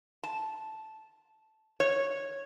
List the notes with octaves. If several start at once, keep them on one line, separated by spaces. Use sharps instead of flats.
A5
C#5